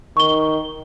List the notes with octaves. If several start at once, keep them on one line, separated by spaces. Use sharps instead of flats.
D#3 C#6 G7